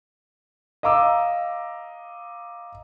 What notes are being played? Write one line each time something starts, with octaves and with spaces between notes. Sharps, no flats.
D#5 F5 A#5 D6 E6